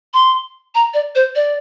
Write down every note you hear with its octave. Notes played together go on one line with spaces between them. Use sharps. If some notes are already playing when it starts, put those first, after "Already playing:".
C6
A#5
D5
C5
D5